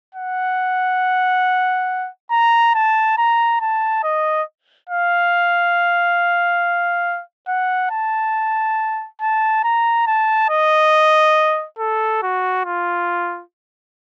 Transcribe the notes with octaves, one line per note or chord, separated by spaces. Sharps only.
F#5
A#5
A5
A#5
A5
D#5
F5
F#5
A5
A5
A#5
A5
D#5
A4
F#4
F4